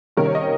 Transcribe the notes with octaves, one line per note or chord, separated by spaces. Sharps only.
C3 D#3 G3 A#3 C#4 A#4
C#5
D#5